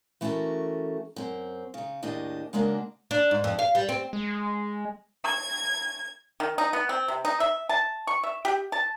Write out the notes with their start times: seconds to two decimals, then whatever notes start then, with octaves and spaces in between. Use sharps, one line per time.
0.21 E3 A3 C#4 F#4 A4 A#4
1.16 F#2 C4
1.74 C#3 D#4
2.03 D#2 A2 D4 G4 G#4 D#5
2.53 C#3 G#3 A#3 D4 F#4 A#4
3.11 D4
3.31 G#2
3.44 F2
3.59 F5
3.75 G3
3.89 C4
4.13 G#3
5.24 G#6
6.40 D#3
6.58 D#4
6.73 B3
6.89 C4
7.08 C3
7.25 D#4
7.40 E5
7.69 A5
8.07 C#6
8.23 E5
8.45 G4
8.72 A5